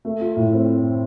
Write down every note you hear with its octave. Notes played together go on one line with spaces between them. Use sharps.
A3
F4
A2
C4